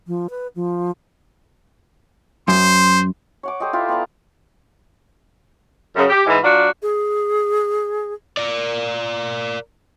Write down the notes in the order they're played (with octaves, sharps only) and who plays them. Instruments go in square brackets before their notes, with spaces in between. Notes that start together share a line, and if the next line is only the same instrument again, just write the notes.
[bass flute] F3
B4
F3
[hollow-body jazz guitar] F#2 [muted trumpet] C5 [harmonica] C6
[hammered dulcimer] C#5 F#5 D6
G4 A4 C5 D#5
E4 F4 E5 G5
B3 G4 D5 A#5
[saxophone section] F#2 C#3
G4
G#2 E3
F#3 D4 F4 F#4
[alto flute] G#4
[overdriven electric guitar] A#4 D5